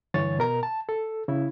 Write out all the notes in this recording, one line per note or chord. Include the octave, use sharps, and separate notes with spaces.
G2 D3 E3 C#5 A6
B2 A#4 A#5
A5
A4
C#3 E4